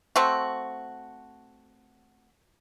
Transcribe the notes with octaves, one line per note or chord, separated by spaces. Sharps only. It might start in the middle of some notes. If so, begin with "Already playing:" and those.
A3 C4 F#4